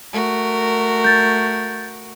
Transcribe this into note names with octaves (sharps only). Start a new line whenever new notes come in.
A3 F#4 A#4
G6 A6